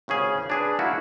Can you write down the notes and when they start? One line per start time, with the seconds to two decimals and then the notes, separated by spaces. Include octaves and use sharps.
0.08 G#1 C#3 C#4 G#4
0.50 D4 G#4 B4
0.79 A#3 E4 F#4 D5